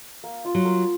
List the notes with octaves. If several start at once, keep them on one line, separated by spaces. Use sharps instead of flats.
A#3
F4
F#3
A#4